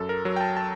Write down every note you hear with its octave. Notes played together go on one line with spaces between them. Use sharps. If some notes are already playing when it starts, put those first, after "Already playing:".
Already playing: F#2 A4
A#4
F#3
G5
A5
A5